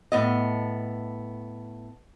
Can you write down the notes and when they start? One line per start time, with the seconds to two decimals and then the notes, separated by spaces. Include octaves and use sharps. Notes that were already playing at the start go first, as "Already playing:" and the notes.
0.12 A2 B3 D#5